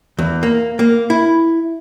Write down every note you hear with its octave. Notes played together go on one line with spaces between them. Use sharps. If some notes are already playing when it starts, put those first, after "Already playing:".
E2
A#3
A#3
E4